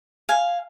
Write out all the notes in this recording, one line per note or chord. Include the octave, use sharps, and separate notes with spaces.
F5 G#5